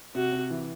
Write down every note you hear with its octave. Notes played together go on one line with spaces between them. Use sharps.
C3 F#4
C3
E3